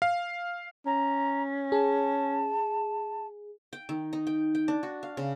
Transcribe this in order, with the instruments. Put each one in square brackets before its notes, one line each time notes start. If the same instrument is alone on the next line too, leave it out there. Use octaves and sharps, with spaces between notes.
[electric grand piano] F5
[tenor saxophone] C#4 [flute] A#5
[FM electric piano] G#4 [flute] A5
[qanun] G5
D#3
D#4
G5
G5
D4
F#4
F5
C#3